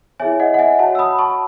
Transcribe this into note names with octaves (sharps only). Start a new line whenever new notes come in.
E4 G#4 C#5 E5 G#5
D#5 F#5
F#5
E5 G#5
F#4 C#5 F#5 A5
E6
B5 D#6
A5 C#6